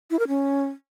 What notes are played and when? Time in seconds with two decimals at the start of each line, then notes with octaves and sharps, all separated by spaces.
0.10 E4
0.19 A#4
0.28 C#4